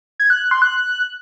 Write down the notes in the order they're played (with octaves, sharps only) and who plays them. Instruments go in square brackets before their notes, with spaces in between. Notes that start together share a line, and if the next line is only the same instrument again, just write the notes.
[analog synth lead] G#6
F#6
F#6
C6
F#6